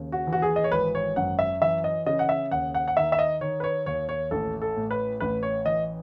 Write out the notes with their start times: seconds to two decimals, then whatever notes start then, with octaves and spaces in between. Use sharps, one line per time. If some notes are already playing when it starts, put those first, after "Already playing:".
Already playing: D#2 C#3
0.12 F#4
0.27 E3
0.33 F#4
0.42 G#4
0.56 D#5
0.64 C#5
0.71 G#1 B4
0.95 C#5
1.16 F#2 F#5
1.39 E5
1.61 E3 E5
1.84 D#5
2.06 C#3 D#5
2.19 F#5
2.29 E5
2.51 D#2 F#5
2.74 F#5
2.88 F#5
2.97 D#3 E5
3.12 E5
3.19 D#5
3.41 D#3 C#5
3.60 B4
3.64 C#5
3.86 D#2 C#5
4.09 C#5
4.31 A1 A4
4.61 A4
4.76 A2
4.91 B4
5.20 A1 B4
5.43 C#5
5.65 E3 D#5